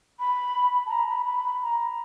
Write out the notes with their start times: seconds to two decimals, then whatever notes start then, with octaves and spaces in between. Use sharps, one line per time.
0.20 B5
0.87 A5
0.91 A#5
1.09 B5
1.26 B5
1.62 A#5